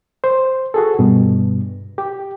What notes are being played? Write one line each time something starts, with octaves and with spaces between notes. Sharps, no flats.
C5
F#4 G#4 A4
G2 B2
G4